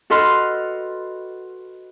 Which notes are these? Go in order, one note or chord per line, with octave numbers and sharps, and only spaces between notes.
F#4 A4 B4 D#5 C6 F6